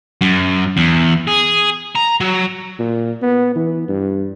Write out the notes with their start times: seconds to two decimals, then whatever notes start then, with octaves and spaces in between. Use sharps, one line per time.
0.21 F#2
0.77 E2
1.27 G#4
1.95 A#5
2.20 F#3
2.79 A#2
3.22 B3
3.56 E3
3.88 G2